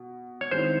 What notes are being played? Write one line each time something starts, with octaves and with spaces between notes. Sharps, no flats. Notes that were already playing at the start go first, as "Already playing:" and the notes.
Already playing: B2
C#5
D#3 G#3 C4 E4 C5